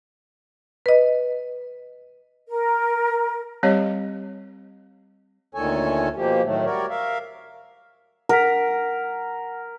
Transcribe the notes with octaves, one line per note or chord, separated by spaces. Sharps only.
B4 D#5
A#4
G3 C4 G4 C#5 D#5
D2 A#2 D#3 A4 C#5 G#5
B2 F3 A#3 G4
A2 D#3 F#3 A3
G3 F#4 A#4 C#5 D5
A#4 E5 F5
A#4 F#5 B6